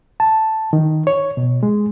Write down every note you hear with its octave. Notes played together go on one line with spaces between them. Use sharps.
A5
D#3
C#5
B2
G#3